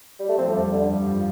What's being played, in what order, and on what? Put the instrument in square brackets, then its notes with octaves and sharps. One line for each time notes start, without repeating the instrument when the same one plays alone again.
[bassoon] G3
A3
[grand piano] F3 [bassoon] C4
[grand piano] G3
[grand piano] F2 F3 [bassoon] A3
[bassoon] D3
[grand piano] G2 G3
F3